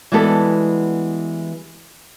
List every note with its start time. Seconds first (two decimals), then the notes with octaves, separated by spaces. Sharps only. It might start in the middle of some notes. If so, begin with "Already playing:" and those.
0.12 E3 G3 G#3 B3 F#4 A4